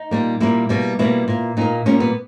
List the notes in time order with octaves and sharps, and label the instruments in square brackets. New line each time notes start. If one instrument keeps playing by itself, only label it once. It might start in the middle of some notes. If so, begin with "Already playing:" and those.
Already playing: [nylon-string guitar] D#4
A#2 G3 A#3
A#2 G3 A#3 E4
B2 G3 A#3
B2 G3 A#3 E4
A#2 A#3
A#2 A#3 D#4
A#2 G3 A#3 C#4
B3